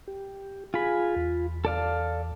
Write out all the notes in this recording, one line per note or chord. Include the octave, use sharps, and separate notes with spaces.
G4
F4 G#4 G#5 B5
E2
A4 D5 F5